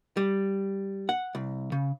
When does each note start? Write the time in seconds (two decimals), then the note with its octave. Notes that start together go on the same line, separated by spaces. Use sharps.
0.17 G3
1.09 F#5
1.35 C2
1.72 C#3